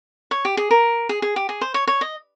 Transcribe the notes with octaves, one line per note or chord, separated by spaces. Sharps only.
C#5
G4
G#4
A#4
G#4
G#4
G4
G#4
C5
C#5
C#5
D#5